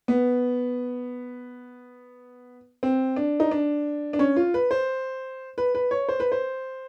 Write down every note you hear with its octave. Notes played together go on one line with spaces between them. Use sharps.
B3
C4
D4
D#4
D4
D4
C#4
F4
B4
C5
B4
B4
C#5
C5
B4
C5